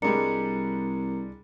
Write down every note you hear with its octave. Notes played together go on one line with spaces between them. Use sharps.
C2 G3 G#3 D4 A#4 A#5 C#7